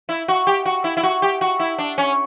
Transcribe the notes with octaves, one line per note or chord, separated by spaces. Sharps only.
E4
F#4
G4
F#4
E4
E4
F#4
G4
F#4
E4
D4
C#4